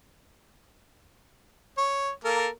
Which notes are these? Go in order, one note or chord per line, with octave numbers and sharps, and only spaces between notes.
C#5
A#3 A4 A#4